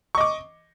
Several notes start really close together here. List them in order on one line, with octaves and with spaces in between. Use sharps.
C#6 D#5 D6